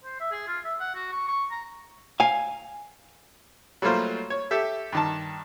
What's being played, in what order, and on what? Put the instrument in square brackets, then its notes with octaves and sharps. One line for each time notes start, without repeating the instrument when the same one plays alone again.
[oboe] C5
E5
G#4
F4
E5
F#5
F#4
C#6
C#6
A#5
[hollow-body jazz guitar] F5 G#5
[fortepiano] F#3 G3 A3 A#3 F4 C5
C#5
G4 A4 E5
G2 D#3 A5